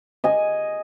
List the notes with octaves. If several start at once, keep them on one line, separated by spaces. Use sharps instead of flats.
D#5 G#5